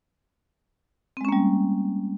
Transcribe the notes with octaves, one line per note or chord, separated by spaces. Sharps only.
G3 G#3 A#3 C4 C#4